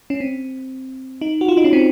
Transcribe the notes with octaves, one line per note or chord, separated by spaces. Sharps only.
C#4
C4
D#4
F#4
F4
D#4
C#4
C4